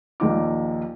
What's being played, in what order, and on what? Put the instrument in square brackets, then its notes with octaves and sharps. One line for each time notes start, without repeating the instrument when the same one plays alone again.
[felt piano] A#1 D#2 D#4 D6